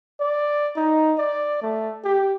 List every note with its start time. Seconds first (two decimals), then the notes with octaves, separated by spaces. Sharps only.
0.20 D5
0.77 D#4
1.18 D5
1.62 A3
2.04 G4